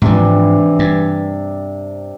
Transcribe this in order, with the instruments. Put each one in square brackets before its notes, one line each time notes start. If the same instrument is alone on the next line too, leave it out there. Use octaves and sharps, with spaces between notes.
[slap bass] G#2 F3 [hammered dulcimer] C3 D4 [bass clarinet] E3
[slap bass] G2